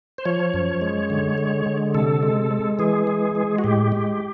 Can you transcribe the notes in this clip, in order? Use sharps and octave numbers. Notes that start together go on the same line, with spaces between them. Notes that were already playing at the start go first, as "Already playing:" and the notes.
C5
F3 C#5
F#2
G#3
D3
G#3
D3
C3 A4
G#3
G#3
E3 G#4
G#3
G#3
F#4
A2 G4
G#3